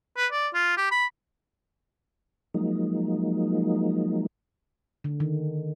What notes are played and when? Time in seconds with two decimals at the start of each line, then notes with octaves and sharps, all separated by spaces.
0.17 B4
0.32 D5
0.54 F4
0.77 G4
0.91 B5
2.54 F3 F#3 G#3 A#3 D#4
5.04 D3
5.20 D#3